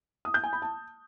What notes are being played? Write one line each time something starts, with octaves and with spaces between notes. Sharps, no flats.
D#6
G6
G#5
B5
A5